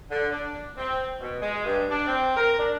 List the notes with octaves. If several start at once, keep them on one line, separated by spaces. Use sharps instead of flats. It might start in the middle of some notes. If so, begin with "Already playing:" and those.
D3
D4
C4
B2
G#3
G2
D4
C4
A#4
D4